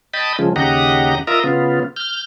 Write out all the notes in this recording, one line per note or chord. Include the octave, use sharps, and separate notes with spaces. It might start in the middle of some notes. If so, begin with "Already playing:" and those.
D#5 G5 A5 B5
C#3 F3 G#3
D#2 C#3 G4 D#5 F#5 A#5
F4 A#4 D#5 E5 A#5
C#3 B3 F4
F6 G6